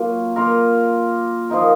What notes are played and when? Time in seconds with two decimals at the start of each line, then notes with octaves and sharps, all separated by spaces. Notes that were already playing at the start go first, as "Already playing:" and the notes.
Already playing: F#3 A#3 F4
0.36 A#3 F4 A#4
1.49 F3 A#3 D#4 A#4